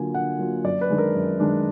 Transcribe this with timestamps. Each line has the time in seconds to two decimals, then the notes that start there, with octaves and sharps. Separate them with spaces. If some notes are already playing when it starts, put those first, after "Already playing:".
Already playing: D3 F#3 A#3 F4 G#5
0.14 D3 F#5
0.39 F#3 A#3 F4
0.64 F#2 D5
0.81 B4
0.90 D#3 G#3 D4
0.98 A#4
1.15 F#2
1.40 D#3 G#3 D4